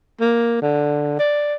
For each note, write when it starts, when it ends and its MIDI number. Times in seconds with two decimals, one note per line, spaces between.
0.21 0.59 58
0.62 1.16 50
1.19 1.56 74